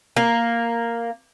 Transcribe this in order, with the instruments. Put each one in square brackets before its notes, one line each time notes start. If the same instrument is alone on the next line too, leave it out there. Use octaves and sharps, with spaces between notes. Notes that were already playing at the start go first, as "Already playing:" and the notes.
[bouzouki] A#3